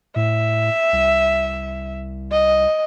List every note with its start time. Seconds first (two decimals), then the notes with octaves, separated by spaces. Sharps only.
0.16 A2 E5
0.93 C2
2.31 D#5